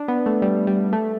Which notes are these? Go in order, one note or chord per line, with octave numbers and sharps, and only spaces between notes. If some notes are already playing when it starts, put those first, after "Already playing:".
Already playing: D4
B3
A3
G3
G3
A3